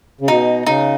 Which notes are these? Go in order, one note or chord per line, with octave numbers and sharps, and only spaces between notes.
C#3
B2 D#4
C#3 D#4